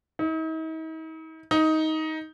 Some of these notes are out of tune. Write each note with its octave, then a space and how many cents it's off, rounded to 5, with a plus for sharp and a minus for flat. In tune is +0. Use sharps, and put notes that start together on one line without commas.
D#4 +45
D#4 +15